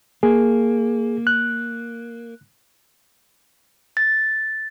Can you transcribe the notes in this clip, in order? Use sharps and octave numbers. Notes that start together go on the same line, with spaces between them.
A#3 G#4
F#6
A6